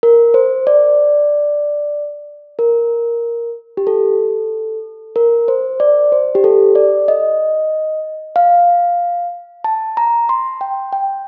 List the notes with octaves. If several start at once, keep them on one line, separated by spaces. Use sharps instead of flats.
A#4
C5
D5
A#4
G4
A4
A#4
C5
D5
C5
G4
A4
D5
D#5
F5
A5
A#5
C6
G5
G5